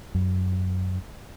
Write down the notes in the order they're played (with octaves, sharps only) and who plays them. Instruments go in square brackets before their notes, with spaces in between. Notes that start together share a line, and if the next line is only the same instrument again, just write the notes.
[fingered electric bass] F#2